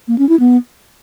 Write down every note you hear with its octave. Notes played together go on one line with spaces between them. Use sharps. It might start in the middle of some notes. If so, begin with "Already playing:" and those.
A#3
C#4
E4
B3